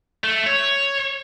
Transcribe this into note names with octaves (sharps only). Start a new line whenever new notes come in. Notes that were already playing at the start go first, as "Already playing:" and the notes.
A3
C#5